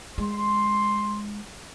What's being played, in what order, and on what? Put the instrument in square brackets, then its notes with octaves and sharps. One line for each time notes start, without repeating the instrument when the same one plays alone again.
[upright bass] G#3 [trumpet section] C6